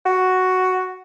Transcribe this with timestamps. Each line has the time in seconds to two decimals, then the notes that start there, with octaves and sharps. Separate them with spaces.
0.06 F#4